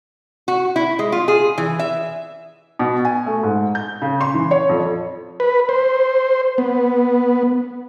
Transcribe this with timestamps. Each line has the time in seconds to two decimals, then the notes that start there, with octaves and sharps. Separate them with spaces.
0.48 F#4
0.76 E4
0.99 G#3
1.12 F4
1.28 G#4
1.58 E3
1.79 E5
2.79 B2
3.05 G#5
3.26 A3
3.43 G#2
3.75 G6
4.02 C#3
4.21 C6
4.34 E3
4.51 C#5
4.69 F2
5.40 B4
5.69 C5
6.58 B3